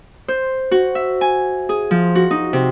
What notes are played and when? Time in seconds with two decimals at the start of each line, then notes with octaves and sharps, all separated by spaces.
0.28 C5
0.71 F#4
0.95 E5
1.21 G#5
1.69 G#4
1.91 F3
2.15 F#4
2.31 D#4
2.53 C3